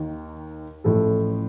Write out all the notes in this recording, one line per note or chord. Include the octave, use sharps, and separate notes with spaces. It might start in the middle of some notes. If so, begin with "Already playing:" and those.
Already playing: D#2 D#3
A1 A2 F3 A4